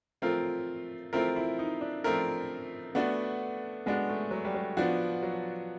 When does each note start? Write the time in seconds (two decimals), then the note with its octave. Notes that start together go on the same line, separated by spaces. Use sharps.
0.22 F3 A3 C4 F4 A#4
1.13 F3 A3 C4 E4 F4 A#4
1.36 E4
1.59 D#4
1.81 D4
2.04 F3 A3 C4 F4 A#4
2.95 A3 B3 D4 F#4
3.86 G#3 B3 D4 F#4
4.09 A3
4.31 F#3
4.45 G3
4.55 F#3
4.77 F3 B3 D4 F#4
5.22 F#3